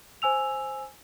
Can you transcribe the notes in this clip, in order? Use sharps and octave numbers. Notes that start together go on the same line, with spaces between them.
C5 G#5 E6 F7